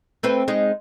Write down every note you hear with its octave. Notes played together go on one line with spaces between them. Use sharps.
A3 C4 B4
G#3 D#4